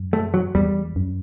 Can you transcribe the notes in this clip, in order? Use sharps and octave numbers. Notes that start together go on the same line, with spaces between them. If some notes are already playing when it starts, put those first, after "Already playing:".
Already playing: F#2
A3
F#3
E2 G3
F#2